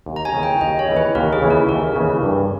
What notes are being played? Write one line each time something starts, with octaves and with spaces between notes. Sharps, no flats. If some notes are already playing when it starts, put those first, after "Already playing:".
D#2
A#5
G#5
C#3 E3
G5
D#2 D#5
C#5
C#3 E3
B4
D#2 A#4
G#4
C#3 E3
A#4
D#2 A#4
C#3 E3
G2